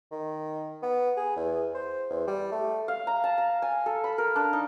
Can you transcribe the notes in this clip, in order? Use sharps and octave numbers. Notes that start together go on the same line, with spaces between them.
D#3
B3
G#4
E2
C5
E2
G3
A3
F5
A#5
A5
A#5
G#5
A4
B5
A#4
D4
D#4